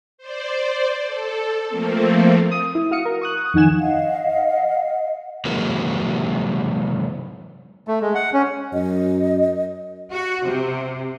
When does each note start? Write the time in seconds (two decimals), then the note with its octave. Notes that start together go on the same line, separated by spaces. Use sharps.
0.18 C5 D5
1.06 A4
1.69 F3 A3 A#3 C4
2.51 D#6
2.75 E4
2.91 F#4 F5 D#6 C#7
3.05 A#4
3.21 C#6 D#6 F#6
3.54 F2 D#3 D#4 F#5 G#5 E7
3.80 D#5 F5 F#5
5.45 C3 E3 F#3 G#3 A#3
7.88 A3
8.01 G#3
8.15 F#5
8.33 C#4
8.73 F#2 D#5
10.12 F#4
10.46 C3